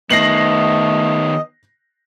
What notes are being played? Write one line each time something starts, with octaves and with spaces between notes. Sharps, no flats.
D#3 A3 B3 D#5 A#6 C7 F#7